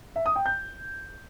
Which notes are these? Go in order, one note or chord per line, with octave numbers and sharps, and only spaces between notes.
E5
D#6
G5
G6